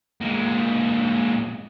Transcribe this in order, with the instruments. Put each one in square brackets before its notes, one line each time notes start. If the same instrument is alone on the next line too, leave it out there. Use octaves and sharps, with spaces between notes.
[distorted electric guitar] A#2 G#3